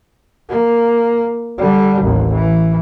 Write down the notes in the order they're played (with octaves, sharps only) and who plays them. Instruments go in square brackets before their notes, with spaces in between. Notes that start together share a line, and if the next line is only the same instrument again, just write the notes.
[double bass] A#3
D3 G3
A1 D#2
E3